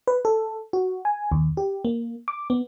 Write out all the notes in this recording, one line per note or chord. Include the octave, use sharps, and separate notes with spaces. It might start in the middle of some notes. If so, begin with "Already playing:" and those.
B4
A4
F#4
G#5
D#2
G4
A#3
D6
B3